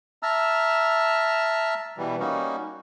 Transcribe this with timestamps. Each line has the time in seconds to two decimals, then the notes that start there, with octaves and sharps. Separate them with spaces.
0.23 E5 A5 A#5 E6 F6
1.97 B2 E3 G3
2.20 G3 A#3 C#4 D#4 F#4